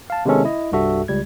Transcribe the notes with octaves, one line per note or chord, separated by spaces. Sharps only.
F5 A5
C3 D#3 G#3 B3 C#4 A4
E4 D#5
C2 G2 G3 F#4 A4 E5
C#2 G3 G#6